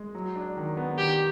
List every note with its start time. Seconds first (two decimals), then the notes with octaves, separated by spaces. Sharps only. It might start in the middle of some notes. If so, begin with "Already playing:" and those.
Already playing: G#3
0.15 F#3
0.36 D4
0.57 D#3
0.77 B3
0.98 D#3 G4